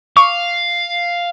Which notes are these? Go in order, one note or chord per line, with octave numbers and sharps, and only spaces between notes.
F5 C#6 D6